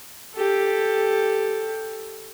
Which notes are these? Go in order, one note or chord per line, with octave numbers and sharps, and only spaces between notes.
G4 A4